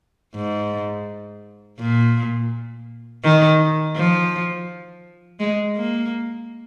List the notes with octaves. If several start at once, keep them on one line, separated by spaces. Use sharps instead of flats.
G#2
A#2
D#3
F3
G#3
A#3